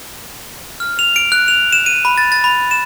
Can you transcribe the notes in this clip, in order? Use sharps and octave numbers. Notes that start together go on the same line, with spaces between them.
F6
F7
D7
F#6
F7
E7
D#7
B5
A6
A6
B5
E7